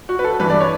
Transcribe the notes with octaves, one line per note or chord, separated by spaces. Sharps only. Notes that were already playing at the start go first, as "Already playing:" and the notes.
F#4
B4
A4
G2 E3 B4
D5
C#5